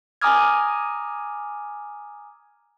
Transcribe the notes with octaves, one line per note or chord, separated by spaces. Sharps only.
G#5 A#5 D6 D#6 F6 G#6